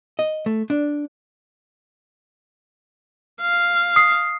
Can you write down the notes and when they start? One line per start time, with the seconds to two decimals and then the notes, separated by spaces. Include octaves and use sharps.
0.19 D#5
0.46 A3
0.70 D4
3.41 F5
3.96 D#6 C7